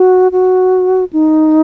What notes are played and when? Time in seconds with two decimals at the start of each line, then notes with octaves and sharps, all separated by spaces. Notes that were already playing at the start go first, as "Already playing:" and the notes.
Already playing: F#4
0.32 F#4
1.13 D#4